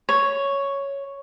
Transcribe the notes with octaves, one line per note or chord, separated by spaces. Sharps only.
C#5